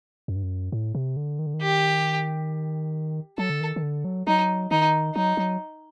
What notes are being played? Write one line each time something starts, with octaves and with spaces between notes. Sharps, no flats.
F#2
G2
F#2
A2
C3
D3
D#3
D3
D#3
G4
F#3 A4
D3
D#3
D#3
D3
F#3
F#3 D#4
D#3 D#4
F#3 D#4
F#3